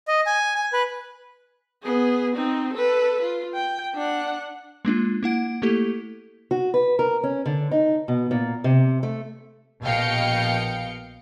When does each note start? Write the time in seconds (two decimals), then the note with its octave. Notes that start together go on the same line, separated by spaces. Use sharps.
0.08 D#5
0.27 G#5
0.55 G#5
0.73 B4
1.83 B3 G#4
2.35 C4 D#4
2.73 A4 B4
3.22 F4
3.54 G5
3.95 D4 F#5
4.85 G#3 A#3 D4 F4
5.23 A#3 E4 F#5 D7
5.62 A3 A#3 E4 G4 A4
6.51 F#4
6.74 B4
6.99 A#4
7.24 C#4
7.46 D3
7.71 D#4
8.08 B2
8.31 A#2
8.64 C3
9.03 A3
9.82 A#1 B2 D#5 F5 G5 C#7